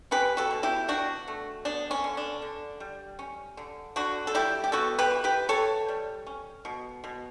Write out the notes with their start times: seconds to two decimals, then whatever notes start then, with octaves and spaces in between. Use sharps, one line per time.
0.11 C#4 G4 B4
0.37 F#4 A4
0.51 B2
0.63 E4 G4
0.88 B2 D4 F#4
1.28 A3
1.65 B3 D4
1.91 C#4
2.04 D3
2.17 D4
2.42 D3
2.80 G3
3.19 C#4
3.57 D3
3.96 D3 D4 F#4
4.27 A4
4.34 G3 E4 G4
4.64 G4
4.72 B3 F#4 A4
4.99 G4 B4
5.11 E3
5.24 G4 B4
5.49 E3 A4 C#5
5.88 G3
6.27 C#4
6.65 B2
7.04 B2